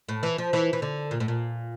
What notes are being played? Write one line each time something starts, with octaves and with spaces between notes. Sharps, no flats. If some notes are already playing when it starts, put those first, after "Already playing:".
A2
E3
F3
E3
E3
D3
A#2
A2
A#2